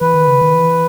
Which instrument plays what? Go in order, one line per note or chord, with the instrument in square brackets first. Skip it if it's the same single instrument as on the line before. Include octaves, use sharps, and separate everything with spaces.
[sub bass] E3 [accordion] B4
[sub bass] D#3
C#3
D#3
E3